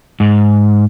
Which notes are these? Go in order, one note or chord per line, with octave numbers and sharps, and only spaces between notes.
G#2